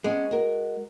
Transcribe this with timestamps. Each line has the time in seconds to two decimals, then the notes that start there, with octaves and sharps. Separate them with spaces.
0.04 G#3 B3 C#4 D4
0.31 F#4 A#4